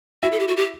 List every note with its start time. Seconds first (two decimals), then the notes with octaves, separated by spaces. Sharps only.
0.23 E4 F#4 E5
0.32 A4
0.40 G4
0.48 F#4
0.57 G4